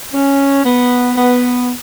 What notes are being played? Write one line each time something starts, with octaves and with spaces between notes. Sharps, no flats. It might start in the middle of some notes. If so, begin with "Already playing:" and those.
C#4
B3
B3